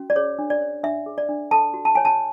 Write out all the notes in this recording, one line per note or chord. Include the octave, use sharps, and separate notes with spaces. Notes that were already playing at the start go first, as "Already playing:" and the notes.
Already playing: C#4 F#4
D5
G#4 C#5
D4
D5
C#5
D4 E5
G#4
D5
D4
A4 A5
F#4
A5
C#5 G#5
A5